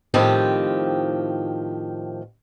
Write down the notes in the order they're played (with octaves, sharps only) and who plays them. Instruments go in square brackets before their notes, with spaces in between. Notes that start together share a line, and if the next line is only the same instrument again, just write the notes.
[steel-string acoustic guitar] A2 D#3 F3 C4 G4